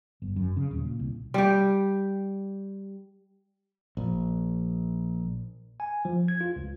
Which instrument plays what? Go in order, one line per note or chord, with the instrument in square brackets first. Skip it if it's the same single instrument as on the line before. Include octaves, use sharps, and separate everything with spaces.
[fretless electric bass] G1
F#2
C#3
D#1
A#2
C2
[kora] G3 G4
[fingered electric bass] A#1
[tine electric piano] G#5
F3
G#6
F4
C#2